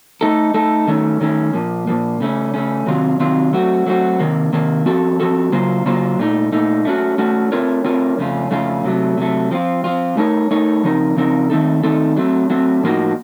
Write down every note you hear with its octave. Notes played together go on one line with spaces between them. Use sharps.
A3 D#4 A4
A3 D#4 A4
D#3 A3 C#4
D#3 A3 C#4
A#2 F3 A#3
A#2 F3 A#3
C#3 A3 C#4
C#3 A3 C#4
C3 D#3 F#3 C4 F4
C3 D#3 F#3 C4 F4
F#3 A3 C4 F#4
F#3 A3 C4 F#4
C3 D#3 A#3
C3 D#3 A#3
F3 C4 F#4 A4
F3 C4 F#4 A4
C#3 F#3 A#3 F4 C5
C#3 F#3 A#3 F4 C5
A#2 A3 D#4
A#2 A3 D#4
A3 C#4 F#4
A3 C#4 F#4
A3 C4 F4 A#4 C#5
A3 C4 F4 A#4 C#5
F2 C#3 A3 C#4 F4
F2 C#3 A3 C#4 F4
C3 F#3 A3
C3 F#3 A3
F3 C4 F4
F3 C4 F4
A3 D#4 A#4 C#5
A3 D#4 A#4 C#5
C#3 F3 C4 D#4 A#4
C#3 F3 C4 D#4 A#4
D#3 A3 C4 D#4 A4
D#3 A3 C4 D#4 A4
F#3 A3 C4
F#3 A3 C4
A2 F3 A#3 D#4 F#4